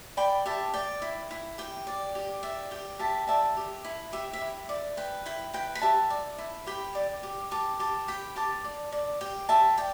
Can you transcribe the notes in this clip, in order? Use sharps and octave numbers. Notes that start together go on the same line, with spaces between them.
D5 G5 B5
G4 E5 A5
D5 G5
E4
E4
G4 G5
D5
G4
D5 E5
G4 G5
G4 E5 A5
D5 E5 A5
G4
E4
G4 E5
E5
E4
D5
B4 G5
E4 G5
B4 G5
B5
G4 E5 A5
D5
E4
G4 G5 B5
D5
G4
G4 A5 D6
G4 A5 D6
G4 G5 B5
G4 A5 D6
D5
D5
G4 G5
G4 E5 A5
D5 G5